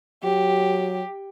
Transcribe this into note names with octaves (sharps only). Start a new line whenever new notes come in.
F#3 G4